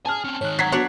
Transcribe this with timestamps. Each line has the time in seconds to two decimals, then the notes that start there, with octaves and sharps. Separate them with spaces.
0.06 G#4 G#5 A5 F6
0.24 C4 C#4
0.41 G#2 D#3 C#5 F#6
0.59 F#3 G#6 B6 C7
0.72 B3 D4 F#4 C#5 F#5